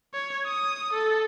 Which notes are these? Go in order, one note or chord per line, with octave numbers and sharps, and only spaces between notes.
C#5
D#6
A4